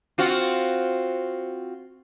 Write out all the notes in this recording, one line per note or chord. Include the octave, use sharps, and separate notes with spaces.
C4 F4 F#4